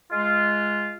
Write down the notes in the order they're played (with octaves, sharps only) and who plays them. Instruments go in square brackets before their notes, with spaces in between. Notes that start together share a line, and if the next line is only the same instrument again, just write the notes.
[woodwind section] G#3 F4